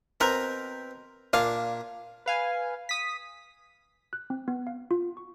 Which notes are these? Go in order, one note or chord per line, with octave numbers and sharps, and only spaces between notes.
B2 C4 A#4 B4
A#2 D4 F5 G#5
B4 F5 G#5
D#6 B6
F#6
C4
B3
F5
F4
C#6